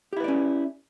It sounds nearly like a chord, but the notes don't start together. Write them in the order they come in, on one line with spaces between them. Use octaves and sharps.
G4 E4 B4 D5 C#4